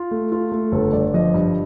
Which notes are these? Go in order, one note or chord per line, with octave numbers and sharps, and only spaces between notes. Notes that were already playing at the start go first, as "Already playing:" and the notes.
Already playing: F4
A3
F4
A3
G1 A4
G1 D5
F3 D#5
G2